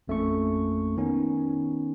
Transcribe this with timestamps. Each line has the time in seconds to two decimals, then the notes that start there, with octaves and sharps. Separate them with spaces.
0.08 A1 F2 A3 A#3 C#4 C#6
0.97 D#3 B3 C#4 D#4